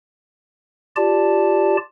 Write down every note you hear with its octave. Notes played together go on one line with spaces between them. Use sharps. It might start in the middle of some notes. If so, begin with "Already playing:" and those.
F4 G4 D5 A5